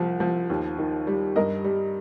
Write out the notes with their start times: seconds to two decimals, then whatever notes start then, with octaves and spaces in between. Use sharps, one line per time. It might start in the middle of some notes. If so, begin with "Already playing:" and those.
Already playing: C2 F3
0.20 F3
0.50 D#2
0.78 D#3
1.07 G3
1.36 G2 A#4 D#5
1.64 G3